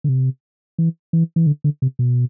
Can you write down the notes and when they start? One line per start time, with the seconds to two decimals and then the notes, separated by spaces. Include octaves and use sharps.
0.04 D3
0.09 C3
0.78 E3
1.13 E3
1.36 E3
1.47 D3
1.64 D3
1.82 C3
1.99 B2